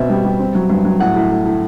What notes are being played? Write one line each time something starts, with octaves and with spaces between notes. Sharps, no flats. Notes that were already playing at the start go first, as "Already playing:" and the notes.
Already playing: B2 C4 E5
G3
G3
C4
F#3
G2
F#3
A2 F#5
A2
A2
A2